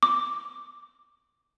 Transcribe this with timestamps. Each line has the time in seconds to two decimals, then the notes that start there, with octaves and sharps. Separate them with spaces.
0.03 D6